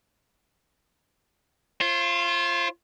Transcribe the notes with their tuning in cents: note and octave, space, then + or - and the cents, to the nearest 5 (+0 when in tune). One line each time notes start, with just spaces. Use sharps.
F4 -25 C5 +35